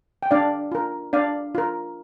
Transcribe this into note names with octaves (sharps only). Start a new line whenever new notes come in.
G5
D4 D5 F5
F4 A#4
D4 D5 F5
F4 A#4